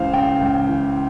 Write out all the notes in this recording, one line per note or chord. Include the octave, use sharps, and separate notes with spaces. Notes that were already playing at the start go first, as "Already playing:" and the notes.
Already playing: C#2 C#3 E3 C5 F5
C#3 G5
C#2
E3